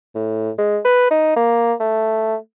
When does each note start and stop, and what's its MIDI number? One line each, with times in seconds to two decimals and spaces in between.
0.16 0.50 45
0.58 0.79 56
0.85 1.10 71
1.11 1.34 63
1.37 1.73 58
1.80 2.36 57